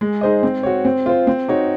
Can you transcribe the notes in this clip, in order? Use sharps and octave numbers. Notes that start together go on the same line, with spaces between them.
G#3
D#4 G#4 C5 D#5
C4
F#4 C#5
C4
F4 C5
C4
D#4 F#4 C#5